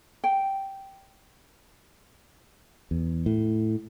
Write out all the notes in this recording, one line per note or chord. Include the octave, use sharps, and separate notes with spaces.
G5
E2
A2